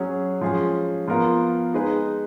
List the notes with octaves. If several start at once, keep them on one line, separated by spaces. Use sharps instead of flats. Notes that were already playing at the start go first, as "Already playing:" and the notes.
Already playing: F#3 C#4 G#4
F3 G#3 C#4 G#4
F3 B3 F4 A#4
G#3 D#4 G#4 B4